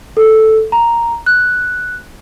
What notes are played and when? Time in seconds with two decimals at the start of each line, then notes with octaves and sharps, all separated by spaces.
0.17 A4
0.72 A#5
1.26 F#6